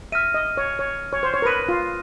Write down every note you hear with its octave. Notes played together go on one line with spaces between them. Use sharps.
E5 F6 A#6 D#7
D#5
C#5
C#5
C#5
C5
C#5
A#4
B4 D#6 F#6 A#6 D#7
F4